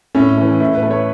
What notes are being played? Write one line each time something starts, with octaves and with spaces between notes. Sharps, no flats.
A2 C#4
E3 A3
A2 E4
B4
A3
C#5